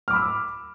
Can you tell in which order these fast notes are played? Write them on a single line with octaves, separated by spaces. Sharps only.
F6 D6 B5 E6